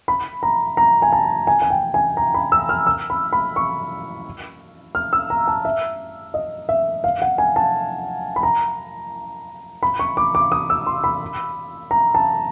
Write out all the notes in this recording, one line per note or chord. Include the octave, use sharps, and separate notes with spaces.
B5
A#5
A#5
G#5
A5
G#5
G#5
G5
G#5
A#5
B5
E6
F6
E6
B5
B5
C#6
F6
E6
A#5
A5
E5
D#5
E5
F5
F#5
G#5
A5
B5
A#5
B5
C#6
D6
D6
D#6
E6
C6
B5
A#5
A5